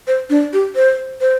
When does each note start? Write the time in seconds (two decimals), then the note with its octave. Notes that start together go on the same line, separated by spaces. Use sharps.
0.07 C5
0.30 D4
0.53 G4
0.76 C5
1.21 C5